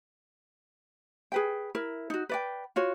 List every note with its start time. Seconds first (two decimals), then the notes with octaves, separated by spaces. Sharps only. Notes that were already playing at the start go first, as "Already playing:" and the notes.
1.32 G#4 B4 G5
1.75 E4 A#4
2.10 D#4 F#4
2.29 B4 D5 G5
2.76 F4 F#4 C#5